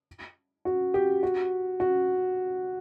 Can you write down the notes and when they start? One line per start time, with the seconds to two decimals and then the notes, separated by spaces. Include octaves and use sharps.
0.65 F#4
0.94 G4
1.23 F#4
1.80 F#4